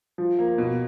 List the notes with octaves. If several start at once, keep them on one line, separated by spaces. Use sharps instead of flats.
F3
A#3
B2